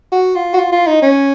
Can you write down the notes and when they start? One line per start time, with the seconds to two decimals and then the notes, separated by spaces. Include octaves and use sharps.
0.12 F#4
0.35 F4
0.53 F#4
0.57 F4
0.72 F4
0.87 D#4
1.02 C#4